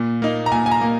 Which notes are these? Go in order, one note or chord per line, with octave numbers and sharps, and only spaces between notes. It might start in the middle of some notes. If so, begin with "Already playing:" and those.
Already playing: A#2
A#3 D#4
A#5
A#2 G#5
G#5
A#5
A#3